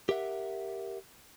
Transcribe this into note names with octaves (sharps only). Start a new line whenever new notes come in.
G4 A#4 E5 F#5